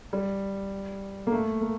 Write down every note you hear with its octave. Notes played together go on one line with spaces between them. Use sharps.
G3
A#3
A3
A#3